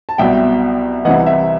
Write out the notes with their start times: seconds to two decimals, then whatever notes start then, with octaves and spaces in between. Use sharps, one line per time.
0.09 A5
0.18 C2 B2 F#3 E5 G5
1.05 C2 C3 E3 D#5 F#5
1.26 E5